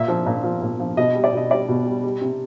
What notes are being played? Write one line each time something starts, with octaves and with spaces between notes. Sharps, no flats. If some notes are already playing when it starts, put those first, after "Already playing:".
Already playing: A#2 E5
F3
A#2
F3
A#2
F3
B2 D#5
G3
D5
B2 D#5
G3 D5
B2
G3
G3
C3